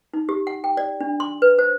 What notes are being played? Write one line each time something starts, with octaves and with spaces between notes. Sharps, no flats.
D#4
G4
F#5
G5
D5
D4
C6
B4
C5